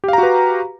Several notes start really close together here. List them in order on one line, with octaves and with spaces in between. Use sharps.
G4 F5 A#5 F#4 B4